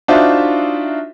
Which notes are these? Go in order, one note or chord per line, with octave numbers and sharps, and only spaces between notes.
D4 D#4 F4 F#4 C5 E5